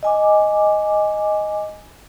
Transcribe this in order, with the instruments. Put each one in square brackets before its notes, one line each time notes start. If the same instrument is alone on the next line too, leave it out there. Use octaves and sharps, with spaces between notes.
[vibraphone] D#5 G#5 D6